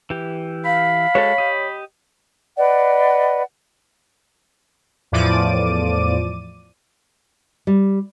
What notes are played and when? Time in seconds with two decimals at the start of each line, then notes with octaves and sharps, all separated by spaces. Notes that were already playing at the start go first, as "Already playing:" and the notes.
0.10 E3 G4
0.65 F5 B5
1.15 G#3 F#4 A4 C#5
1.38 G4 D#5
2.57 B4 D5 D#5 F#5
5.12 E2 A2 F3 D5 D6 D#7
7.67 G3